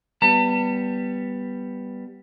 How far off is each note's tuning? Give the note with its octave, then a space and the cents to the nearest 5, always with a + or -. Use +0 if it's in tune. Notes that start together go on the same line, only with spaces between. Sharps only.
G3 +0 B3 +0 A5 +40